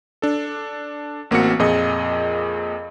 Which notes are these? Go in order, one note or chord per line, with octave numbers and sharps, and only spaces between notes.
D4 A4
A1 A#3 C4 F#4 C#7
F2 A#2 G#4 D#5